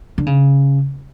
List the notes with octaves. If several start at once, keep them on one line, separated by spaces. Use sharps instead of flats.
D3
C#3